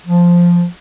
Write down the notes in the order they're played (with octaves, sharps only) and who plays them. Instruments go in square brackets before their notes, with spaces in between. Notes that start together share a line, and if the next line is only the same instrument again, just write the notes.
[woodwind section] F3